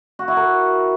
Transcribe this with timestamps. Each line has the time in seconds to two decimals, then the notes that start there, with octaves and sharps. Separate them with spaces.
0.19 F#4
0.28 E4
0.37 A#4